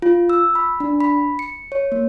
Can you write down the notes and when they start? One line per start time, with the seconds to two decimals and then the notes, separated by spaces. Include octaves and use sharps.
0.02 F4
0.30 E6
0.55 B5
0.80 D4
1.00 B5
1.39 C#7
1.72 C#5
1.92 A#3